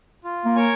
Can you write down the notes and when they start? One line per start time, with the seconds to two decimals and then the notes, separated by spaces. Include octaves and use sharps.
0.24 F4
0.45 A#3
0.55 A#4 C#5 G#5